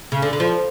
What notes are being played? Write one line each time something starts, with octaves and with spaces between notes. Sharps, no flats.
C#3
D3
D3
F3